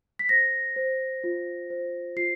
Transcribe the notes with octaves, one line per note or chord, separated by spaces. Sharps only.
B6
C5 A#6
C5
F4
C5
F4 C7